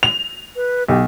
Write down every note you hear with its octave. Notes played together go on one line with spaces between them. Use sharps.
F7
B4
B1 G4